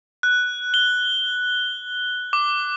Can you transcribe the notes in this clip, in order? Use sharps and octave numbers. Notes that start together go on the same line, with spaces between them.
F#6
G7
D6